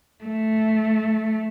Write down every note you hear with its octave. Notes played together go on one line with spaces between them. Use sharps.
A3